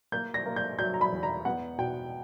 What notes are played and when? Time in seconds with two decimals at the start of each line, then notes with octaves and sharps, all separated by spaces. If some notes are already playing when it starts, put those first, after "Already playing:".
0.12 A#3 G6
0.34 A#6
0.46 A#3
0.56 G6
0.79 F#3 G6
0.94 A#5
1.01 B5
1.12 E2
1.23 A#5
1.45 B3 F#5
1.78 B2 G5